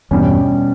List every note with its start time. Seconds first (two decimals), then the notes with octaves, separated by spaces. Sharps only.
0.11 E2 G2 B2 G3 C#4